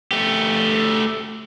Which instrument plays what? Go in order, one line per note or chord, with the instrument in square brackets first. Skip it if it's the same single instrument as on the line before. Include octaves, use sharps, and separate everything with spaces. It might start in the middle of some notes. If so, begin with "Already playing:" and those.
[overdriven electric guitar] A3 G4